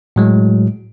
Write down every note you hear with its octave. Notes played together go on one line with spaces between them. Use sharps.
A2 F#3 G#3